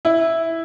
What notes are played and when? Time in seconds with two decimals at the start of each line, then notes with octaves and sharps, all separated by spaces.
0.05 E4